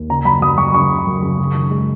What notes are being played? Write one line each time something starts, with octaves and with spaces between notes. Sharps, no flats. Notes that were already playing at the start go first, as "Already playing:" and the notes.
Already playing: D#2
C#3 A#5
F#2 B5
F#2 D#6
F#2 C#6
C#3 C#6
C#3
F#2
C#3
F#2
D#3
G#3